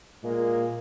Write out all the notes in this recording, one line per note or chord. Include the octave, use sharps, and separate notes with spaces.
A#2 G#3 A#3